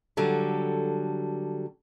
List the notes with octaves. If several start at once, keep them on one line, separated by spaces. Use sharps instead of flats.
D3 F#3 G3 A4